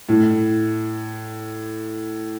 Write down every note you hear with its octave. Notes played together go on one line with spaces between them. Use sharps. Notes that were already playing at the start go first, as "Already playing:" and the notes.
A2